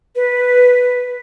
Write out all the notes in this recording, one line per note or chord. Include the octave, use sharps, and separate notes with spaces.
B4